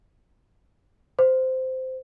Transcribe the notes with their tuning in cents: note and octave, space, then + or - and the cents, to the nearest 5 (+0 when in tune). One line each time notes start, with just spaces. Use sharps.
C5 -10